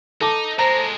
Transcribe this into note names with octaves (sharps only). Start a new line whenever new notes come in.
D#4 A4 A5 D6
A#2 G#3 C5 A#5